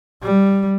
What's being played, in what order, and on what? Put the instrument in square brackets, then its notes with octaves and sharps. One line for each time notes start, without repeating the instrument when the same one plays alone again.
[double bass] G3